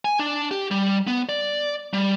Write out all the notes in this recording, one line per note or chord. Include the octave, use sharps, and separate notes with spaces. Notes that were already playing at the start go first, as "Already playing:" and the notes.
G#5
D4
G4
G3
B3
D5
G3